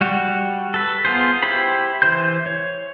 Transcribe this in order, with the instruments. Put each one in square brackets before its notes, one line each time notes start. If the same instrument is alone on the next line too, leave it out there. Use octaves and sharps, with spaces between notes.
[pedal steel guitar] G3 F#4
A4 B4
B3 F4 G#4 C5
E4 G4 C5 B5
E3 C5 C6 G6
C#5